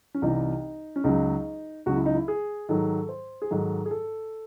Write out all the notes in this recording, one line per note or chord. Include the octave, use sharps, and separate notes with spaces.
C#4
C2 C3 E3 D#4
C#4
C#2 C#3 F#3 D#4
C#2 C#3 F#3 F#4
E4
D#4
E4
G#4
G#2 D#3 F#3 A4
C5
G#4
G#2 D#3 F#3 A4
G#4
A4